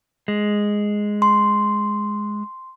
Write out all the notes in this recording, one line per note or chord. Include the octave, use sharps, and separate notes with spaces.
G#3
C6